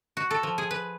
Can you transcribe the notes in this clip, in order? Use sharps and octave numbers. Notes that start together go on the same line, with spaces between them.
F#4
A4
F3
G#4
B4